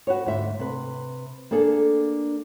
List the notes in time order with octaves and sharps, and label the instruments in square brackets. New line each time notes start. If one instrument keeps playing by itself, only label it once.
[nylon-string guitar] F#4 B4 C#5
D2 G#2 E5
C3 B4
A#3 D4 G#4 A4